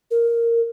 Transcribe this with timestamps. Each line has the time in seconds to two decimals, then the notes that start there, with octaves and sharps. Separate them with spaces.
0.11 A#4